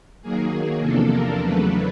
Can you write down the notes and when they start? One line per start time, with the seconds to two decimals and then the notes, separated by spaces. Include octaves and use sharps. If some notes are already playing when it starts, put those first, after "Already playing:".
0.22 D#3 F#3 A#3 G#4
0.52 G#4
0.81 E2 C3 F3 A#3 D4 A4
1.11 A#4
1.41 E2 C#3 F#3 A3 D4 B4